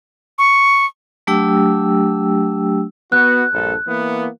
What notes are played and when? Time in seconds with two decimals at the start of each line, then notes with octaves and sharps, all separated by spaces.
0.38 C#6
1.27 F#3 A3 D4 G4 G5 E6
3.12 B3 F#4 F#6
3.53 A#1 G2 A4
3.87 E3 A#3 B3